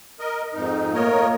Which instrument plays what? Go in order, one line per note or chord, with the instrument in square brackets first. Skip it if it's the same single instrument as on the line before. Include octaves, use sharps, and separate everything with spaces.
[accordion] A#4 D#5
F2 G#2 D#4
[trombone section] A#2 A3 A#3 [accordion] A#4 C#5 D#5